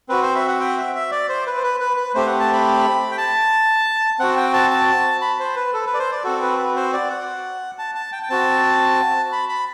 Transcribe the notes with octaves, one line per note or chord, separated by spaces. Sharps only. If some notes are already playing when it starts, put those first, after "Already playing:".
C4 F#4 B4
C5
E5
F#5
G5
E5
E5
D5
C5
B4
C5
B4
B4
B4
A3 C4 G4 C5
F#5
A5
B5
G5
A5
C4 F#4 F#5
G5
A5
A5
B5
C5
B4
A4
B4
D5
C5
D5
C4 F#4 A4
B4
B4
C5
D5
F#5
A5
A5
G5
G5
C4 F#4 A5
B5
B5